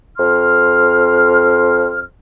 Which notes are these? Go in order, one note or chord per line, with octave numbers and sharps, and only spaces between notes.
F2 C6 F6